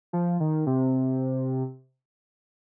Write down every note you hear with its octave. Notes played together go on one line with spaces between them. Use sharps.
F3
D#3
C3